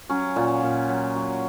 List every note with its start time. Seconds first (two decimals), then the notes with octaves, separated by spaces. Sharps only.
0.09 F#3 C#4
0.36 A#2
0.63 A#2
0.89 F#3
1.16 F#3